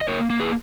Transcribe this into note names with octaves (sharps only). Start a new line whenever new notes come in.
D#5
A#3 A#4 C#5
A#3
G#4 B4